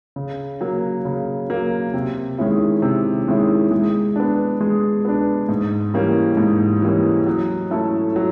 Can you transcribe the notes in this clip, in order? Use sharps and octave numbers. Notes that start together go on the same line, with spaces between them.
C#3
F#3 A#3
C#3
F#3 A#3
C3
D#3 G#3 C#4 E4
C3
D#3 G#3 C#4 E4
G#3
B3 D4
G#3
B3 D4
G#2
E3 G3 A#3 C#4
G#2
E3 G3 A#3 C#4
F#3
A3 C#4 E4 A4
F#3